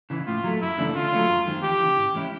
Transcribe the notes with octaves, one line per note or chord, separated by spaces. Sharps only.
C#3 E3
A2 F4
F#3 A3
F#2 E4
C#3 E3 A3 D4
D3 F4
F#3 A3 C#4
F#2
D#3 G#3 C4
E2 G4
C#3 E3
G#2
E3 G#3 C#4 E4